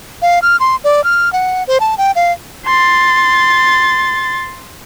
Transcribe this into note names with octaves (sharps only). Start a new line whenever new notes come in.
F5
F6
C6
D5
F6
F#5
C5
A5
G5
F5
C6 A6